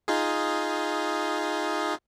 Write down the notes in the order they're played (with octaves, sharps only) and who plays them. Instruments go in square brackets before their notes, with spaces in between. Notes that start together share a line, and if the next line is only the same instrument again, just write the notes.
[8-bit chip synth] D#4 F4 G#4